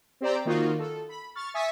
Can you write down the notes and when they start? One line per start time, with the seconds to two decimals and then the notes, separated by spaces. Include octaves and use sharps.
0.21 C4 G4 C5 D5 G5 A#5
0.45 D#3 A#3 D#4 F4 F#4
0.79 A4
1.09 B5
1.35 C#6 F6 A6
1.54 E5 G#5 C#6 D#6 A6 B6